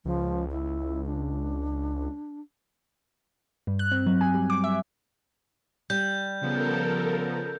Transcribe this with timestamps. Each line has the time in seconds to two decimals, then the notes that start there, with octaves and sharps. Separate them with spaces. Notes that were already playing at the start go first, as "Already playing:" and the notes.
0.05 C#2 F3
0.51 E4
1.06 D4
3.67 G2
3.79 F#6
3.92 C4
4.07 F#3
4.21 G#5
4.34 G3
4.50 D6
4.64 E5
5.90 G3 G6
6.41 C#3 F3 B3 A4 A#4